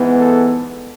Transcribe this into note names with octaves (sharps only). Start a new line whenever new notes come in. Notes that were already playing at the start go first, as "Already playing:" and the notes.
Already playing: G#2 E3 B3
A4